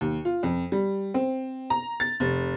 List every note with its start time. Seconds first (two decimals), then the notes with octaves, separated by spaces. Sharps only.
0.01 D#2
0.25 F4
0.43 F2
0.72 G3
1.14 C4
1.70 A#5
2.00 A6
2.20 F1